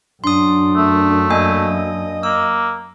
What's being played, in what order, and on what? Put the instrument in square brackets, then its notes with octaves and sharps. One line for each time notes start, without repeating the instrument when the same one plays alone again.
[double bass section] F#2 [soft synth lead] D4 [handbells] C6 D#6
[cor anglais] A3
[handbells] A#3 D4 G#5 [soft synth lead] D#5
[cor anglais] A#3 [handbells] E6